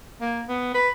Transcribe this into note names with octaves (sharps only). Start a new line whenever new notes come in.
A#3
B3
B4